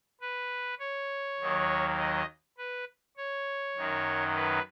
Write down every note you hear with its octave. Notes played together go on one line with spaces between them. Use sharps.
B4
C#5
D#2 D#3 F#3
D#5
B4
C#5
F#2 D#3 F#3
B4